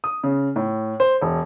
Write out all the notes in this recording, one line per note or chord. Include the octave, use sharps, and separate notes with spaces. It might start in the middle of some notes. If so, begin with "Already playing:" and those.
D#6
C#3
A2
C5
E1